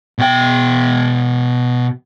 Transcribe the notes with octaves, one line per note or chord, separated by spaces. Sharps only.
B2 G5